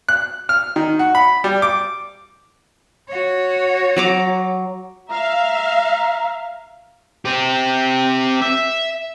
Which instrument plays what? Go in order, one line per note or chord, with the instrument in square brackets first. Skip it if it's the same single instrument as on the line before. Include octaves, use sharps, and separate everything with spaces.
[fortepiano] F#6
F6
D#3
F#4
B5
G3
D6
[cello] F#4 C#5
[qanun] F#3 A#5 D6
[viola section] E5 F5 [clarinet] A#5
[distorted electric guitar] C4 G4
E5